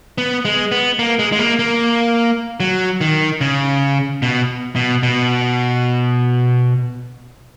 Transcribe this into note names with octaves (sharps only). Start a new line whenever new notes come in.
B3
G#3
B3
A#3
G#3
G#3
A#3
A#3
F#3
D#3
C#3
B2
B2
B2